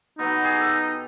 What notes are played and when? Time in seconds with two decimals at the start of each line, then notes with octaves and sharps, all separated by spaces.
0.19 B2 F#3 D#4
0.44 G4 G#4
0.61 A4